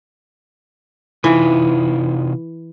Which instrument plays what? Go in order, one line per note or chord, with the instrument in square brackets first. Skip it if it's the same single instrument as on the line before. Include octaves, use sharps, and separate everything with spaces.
[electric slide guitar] C3 D#4 F4 [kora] E3